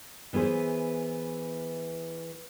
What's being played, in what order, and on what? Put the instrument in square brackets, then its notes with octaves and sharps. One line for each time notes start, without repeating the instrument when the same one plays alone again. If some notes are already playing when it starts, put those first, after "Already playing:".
[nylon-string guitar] E3 B3 E4 G#4 C5